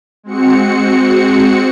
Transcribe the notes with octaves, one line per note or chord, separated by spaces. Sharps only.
G#3 C4 F#4 C#7